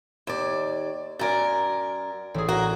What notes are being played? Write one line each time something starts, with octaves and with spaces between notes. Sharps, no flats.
D#2 D5
F#2 A#4 D5 G#5 A6
A1 G#4
F#4 A#4